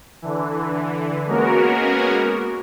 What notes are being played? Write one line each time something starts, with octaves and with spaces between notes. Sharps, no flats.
D3 E3
G#3 A#3 B3 C#4 F#4 A#4